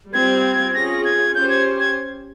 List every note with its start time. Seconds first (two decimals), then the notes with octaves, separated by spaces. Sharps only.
0.13 G3 C4 F4 G#6
0.74 C#4 F4 G#4 A#6
1.05 G#6
1.35 C#4 G4 C5 G6
1.49 G#6
1.80 G#6